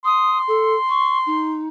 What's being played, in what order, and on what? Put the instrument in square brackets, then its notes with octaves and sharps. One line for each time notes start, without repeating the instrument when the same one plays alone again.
[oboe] C6 [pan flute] D#6
[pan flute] A4
C#6
D#4